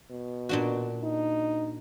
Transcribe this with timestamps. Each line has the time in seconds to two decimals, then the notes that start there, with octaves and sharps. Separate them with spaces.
0.10 B2
0.49 A#2 D4 F#4
1.03 D#4